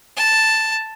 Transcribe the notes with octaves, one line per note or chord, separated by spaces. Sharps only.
A5